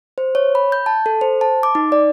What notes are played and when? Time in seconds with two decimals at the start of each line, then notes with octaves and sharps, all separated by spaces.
0.18 C5
0.35 C#5
0.55 B5
0.72 G6
0.86 A5
1.06 A4
1.21 C5
1.41 A5
1.63 D6
1.75 D#4
1.92 D5